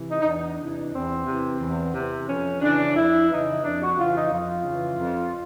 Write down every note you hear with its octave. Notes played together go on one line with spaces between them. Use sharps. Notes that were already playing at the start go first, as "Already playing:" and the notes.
Already playing: C3 E3
D#4
D#4
E2 D4
C3 E3
E2 C4
C3 E3
E2
C3 E3
F2 C#4
C#3 E3 D4
F2 E4
C#3 E3 D#4
F2 D4
F#4
C#3 E3 F4
D#4
F2 F4
C#3 E3
F2